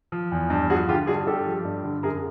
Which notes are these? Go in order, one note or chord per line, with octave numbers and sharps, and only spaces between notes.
F3
E2
G2
F3 F#4 G#4
D3 F4 G4
G2 F#4 G#4
G2 G4 A4
F3
G2
D3
F#2 G#4 A#4